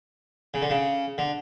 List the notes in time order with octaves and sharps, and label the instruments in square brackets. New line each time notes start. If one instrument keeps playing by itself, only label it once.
[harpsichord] C#3
D3
C#3
D3